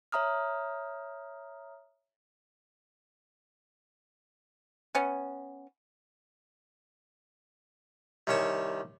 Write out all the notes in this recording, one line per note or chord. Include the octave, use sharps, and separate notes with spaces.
C#5 E5 A#5 D#6 F6
B3 C#4
C2 D#3 C#4 C#5 A5